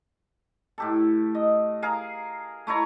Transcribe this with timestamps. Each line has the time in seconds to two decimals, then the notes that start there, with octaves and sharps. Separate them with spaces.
0.78 A2 G4 A4
1.35 D#5
1.83 G#4 A#4 F5
2.67 A3 E4 C#5 A#5